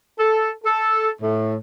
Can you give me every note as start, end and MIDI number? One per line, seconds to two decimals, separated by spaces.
0.19 0.50 69
0.64 1.09 69
1.21 1.54 45